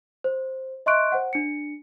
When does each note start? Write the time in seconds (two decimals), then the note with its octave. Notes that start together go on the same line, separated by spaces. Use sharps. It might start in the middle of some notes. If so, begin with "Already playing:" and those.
0.24 C5
0.86 D#5 E5 C6 C#6 F#6 D7
1.12 C5 F#5
1.33 D4 C#7